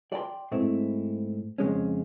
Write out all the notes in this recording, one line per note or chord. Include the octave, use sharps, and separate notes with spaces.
D5 G5 A5 C6
G#2 A3 C4 E4
F2 C#3 G#3 C#4